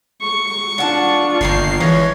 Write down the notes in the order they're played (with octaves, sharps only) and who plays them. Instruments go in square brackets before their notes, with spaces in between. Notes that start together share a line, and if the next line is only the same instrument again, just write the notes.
[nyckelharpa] C#6
[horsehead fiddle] D4 F4 [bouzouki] F#5 A5
[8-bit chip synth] G1 C7 [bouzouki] D#3 A#3 A#4
[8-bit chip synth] E3 [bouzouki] F3 G#3 C#4 [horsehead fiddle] C#5